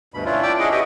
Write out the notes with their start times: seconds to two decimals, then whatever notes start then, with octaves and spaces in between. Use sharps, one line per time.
0.14 D2 G2 B2 B5
0.25 C#4 D4 E4 F4
0.43 D5 G5 A5 B5 D6 E6
0.59 C#4 D4 E4 G#4 D#5 F#5
0.72 F#4 G4 B4 D#5 E5 G5